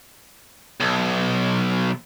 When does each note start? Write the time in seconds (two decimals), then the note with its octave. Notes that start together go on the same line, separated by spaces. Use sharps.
0.80 B1